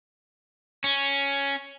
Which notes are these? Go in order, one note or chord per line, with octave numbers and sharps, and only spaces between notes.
C#4